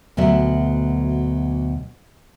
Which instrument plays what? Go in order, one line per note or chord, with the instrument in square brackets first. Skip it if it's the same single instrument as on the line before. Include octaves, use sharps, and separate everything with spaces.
[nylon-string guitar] D2 B2 F#3 E5